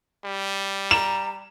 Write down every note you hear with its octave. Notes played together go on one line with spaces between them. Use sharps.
G3
A#5 E7